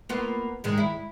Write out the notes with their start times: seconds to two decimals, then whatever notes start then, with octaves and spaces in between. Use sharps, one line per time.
0.09 A#3 B3 F4
0.64 G#2 D#3 G#3
0.77 E4